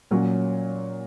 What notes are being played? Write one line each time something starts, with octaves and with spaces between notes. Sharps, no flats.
A#2 F#3 C#4